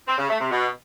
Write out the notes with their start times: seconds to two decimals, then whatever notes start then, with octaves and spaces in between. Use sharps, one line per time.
0.07 C4
0.18 C#3
0.29 A3
0.40 C3
0.51 B2